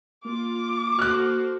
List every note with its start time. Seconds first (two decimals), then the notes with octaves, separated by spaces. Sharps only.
0.25 A#3 F4 D6
0.99 F#4 A4 C5 F6 F#6